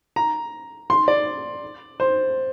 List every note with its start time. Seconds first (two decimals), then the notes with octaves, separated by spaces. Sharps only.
0.16 A#5
0.90 C6
1.08 D5
2.00 C5